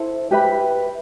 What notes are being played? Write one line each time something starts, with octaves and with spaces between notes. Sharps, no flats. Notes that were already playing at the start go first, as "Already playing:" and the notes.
Already playing: E4 A4 C5
G4 B4 E5 B5